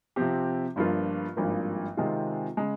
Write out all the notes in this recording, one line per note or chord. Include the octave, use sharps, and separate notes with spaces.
C3 F3 C4 G4
G1 G2 F3 A#3 F4
G#1 G2 F3 A#3
C3 D#3 G#3 C4 F4
C#3 G#3